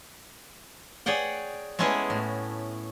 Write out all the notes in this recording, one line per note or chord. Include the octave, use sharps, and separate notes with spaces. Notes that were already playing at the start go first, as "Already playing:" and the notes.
G#4 C#5 D5 F#5 G5
G#3 A3 B3 C#4 E4 G#4
A2